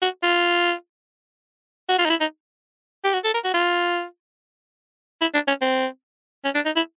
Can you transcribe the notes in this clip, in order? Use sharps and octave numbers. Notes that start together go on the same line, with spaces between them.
F#4
F4
F#4
F4
D#4
E4
D#4
G4
F#4
A4
A#4
F#4
F4
E4
D4
C#4
C4
C#4
D4
D#4
E4